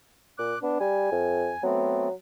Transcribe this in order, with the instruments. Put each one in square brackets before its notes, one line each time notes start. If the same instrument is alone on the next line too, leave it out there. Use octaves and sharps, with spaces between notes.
[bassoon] A#2 [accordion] D6 F#6
[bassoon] B3 [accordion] D4
[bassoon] G3 [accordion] G#5
[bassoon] F2
[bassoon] F#3 [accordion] A3 B3 C4